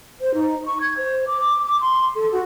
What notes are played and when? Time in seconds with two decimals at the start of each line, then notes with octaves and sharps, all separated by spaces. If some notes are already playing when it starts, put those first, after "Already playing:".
0.21 C5
0.33 D#4
0.65 C#6
0.80 G#6
0.97 C5
1.27 D6
1.63 D6
1.80 C6
2.15 A4
2.31 F#4